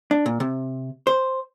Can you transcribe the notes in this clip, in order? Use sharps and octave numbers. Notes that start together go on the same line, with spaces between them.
D4
A#2
C3
C5